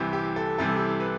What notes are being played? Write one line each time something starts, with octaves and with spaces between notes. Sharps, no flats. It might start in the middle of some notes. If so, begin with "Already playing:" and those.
Already playing: C2 C3 E3 G4
G4
A4
C2 C3 E3 G3 A4
G4
B4